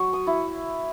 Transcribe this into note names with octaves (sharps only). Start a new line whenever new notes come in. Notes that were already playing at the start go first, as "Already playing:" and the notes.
Already playing: F#3 C#6
D#6
E4